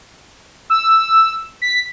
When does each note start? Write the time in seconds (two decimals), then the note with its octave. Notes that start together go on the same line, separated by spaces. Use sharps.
0.70 E6
1.62 B6